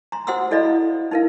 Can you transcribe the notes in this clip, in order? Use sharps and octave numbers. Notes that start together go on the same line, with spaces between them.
A#5 C6
F#4 C5 F#5 C6 D#6 E6
E4 A4 D5 D#5 F5 B5
D#4 E4 A#4 B4 F5